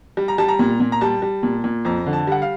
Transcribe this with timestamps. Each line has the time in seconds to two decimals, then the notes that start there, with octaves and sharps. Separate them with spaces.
0.17 G3
0.28 A#5
0.38 G3 A5
0.48 A#5
0.59 A#2
0.80 A#2
0.92 A#5
1.01 G3 A5
1.22 G3
1.43 A#2
1.64 A#2
1.85 F2 A#5
2.06 D3
2.13 A5
2.27 G3 F#5
2.42 F5